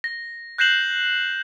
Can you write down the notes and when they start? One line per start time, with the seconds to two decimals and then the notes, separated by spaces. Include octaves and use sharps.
0.04 A#6
0.58 F#6 G6 A#6 C7 E7 F#7